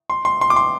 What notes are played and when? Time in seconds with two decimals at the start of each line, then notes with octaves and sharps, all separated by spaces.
0.10 C6
0.25 C6
0.41 C6
0.50 D6
0.56 C6